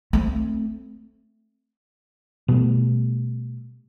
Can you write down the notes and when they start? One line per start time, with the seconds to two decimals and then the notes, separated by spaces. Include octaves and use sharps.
0.13 A3 C4
2.48 B2 G3 A3